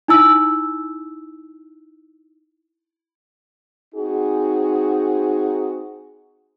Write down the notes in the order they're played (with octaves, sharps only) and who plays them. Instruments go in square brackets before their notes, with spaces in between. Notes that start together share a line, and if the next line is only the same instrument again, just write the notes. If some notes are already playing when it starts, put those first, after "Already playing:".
[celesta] D#4 E4 E6
[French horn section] C4 D#4 F#4 G#4